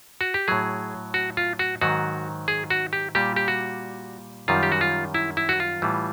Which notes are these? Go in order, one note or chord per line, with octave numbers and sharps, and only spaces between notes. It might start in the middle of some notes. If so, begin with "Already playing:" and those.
F#4
G4
A2 F#3 G#4
F#4
F4
F#4
G#2 D#3 F#3 F#4
G#4
F#4
G4
A#2 G3 G4
G4
F#4
F#2 D#3 G3 F4
G4
F#4
F4
E4
E4
F#4
F4
A2 E3 G3